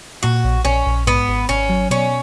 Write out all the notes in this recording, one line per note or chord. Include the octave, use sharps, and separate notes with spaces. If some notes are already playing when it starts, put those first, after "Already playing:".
A#2 F#4
A#1
A#1 C#4
A#1
G#2 B3
G#1
G#1 C#4
F#3
B2 C#4